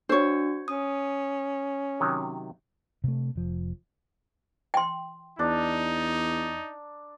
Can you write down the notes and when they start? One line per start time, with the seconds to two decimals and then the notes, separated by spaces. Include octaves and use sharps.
0.09 D4 F#4 C5 C#5
0.68 C#4 D#6
2.00 C3 D#3 F#3
3.04 C3 A3
3.36 F1 F3
4.74 G5 C6
5.39 E2 D4 D#4 A#5